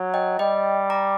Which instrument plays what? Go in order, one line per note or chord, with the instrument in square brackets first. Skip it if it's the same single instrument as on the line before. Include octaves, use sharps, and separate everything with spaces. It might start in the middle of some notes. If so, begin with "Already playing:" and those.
Already playing: [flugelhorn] F#3
[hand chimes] D#5 G5
[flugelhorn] G3 [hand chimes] D#5 G5
[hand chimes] A#5 D6